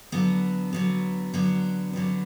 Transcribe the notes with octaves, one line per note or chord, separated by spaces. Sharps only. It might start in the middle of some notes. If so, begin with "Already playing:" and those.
D3 F#3 B3
D3 F#3 B3
D3 F#3 B3
D3 F#3 B3